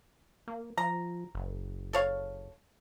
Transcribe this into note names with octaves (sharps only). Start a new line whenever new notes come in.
A#3
F3 A#5
F#1
A4 C#5 F5